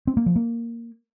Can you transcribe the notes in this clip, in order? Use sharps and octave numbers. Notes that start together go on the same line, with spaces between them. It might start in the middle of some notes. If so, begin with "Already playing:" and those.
C4
A#3
F3
A#3